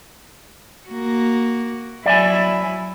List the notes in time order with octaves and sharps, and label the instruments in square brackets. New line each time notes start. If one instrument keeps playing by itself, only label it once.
[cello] A#3 F#4
[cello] F#3 E4 [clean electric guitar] D5 E5 G#5